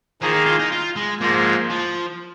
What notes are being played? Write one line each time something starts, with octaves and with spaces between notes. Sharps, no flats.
D#3 F3 A#3 G#4
D#4
F4
D#4
F4
G#3
G#2 F3 G#3 A#3
F3